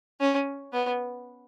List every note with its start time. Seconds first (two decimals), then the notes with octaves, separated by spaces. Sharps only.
0.21 C#4
0.73 B3